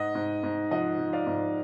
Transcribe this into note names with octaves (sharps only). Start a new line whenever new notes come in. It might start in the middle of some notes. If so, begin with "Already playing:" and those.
Already playing: G#2 D#5 F#5
G#2
G#2
F3 D#5 F#5
F3
D5 F5
G#2